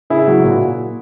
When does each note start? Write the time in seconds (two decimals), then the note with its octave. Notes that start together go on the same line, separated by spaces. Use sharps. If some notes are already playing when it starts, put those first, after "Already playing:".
0.10 C#3 E4 G#4
0.28 F#3
0.44 A#2 F#4